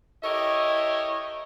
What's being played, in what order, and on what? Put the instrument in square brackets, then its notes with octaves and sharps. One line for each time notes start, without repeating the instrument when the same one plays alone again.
[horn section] E4 G4 A4 A#4 C#5 D#5